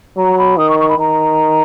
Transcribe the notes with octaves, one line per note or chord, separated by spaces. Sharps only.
F#3 A#5
B5
D#3 D#6
C#6
C#6
B5
D#3 A#5